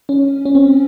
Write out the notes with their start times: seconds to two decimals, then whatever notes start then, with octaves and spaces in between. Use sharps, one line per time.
0.09 C#4
0.45 C#4
0.55 C4